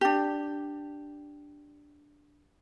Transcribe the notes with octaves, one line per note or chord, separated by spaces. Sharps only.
D4 G4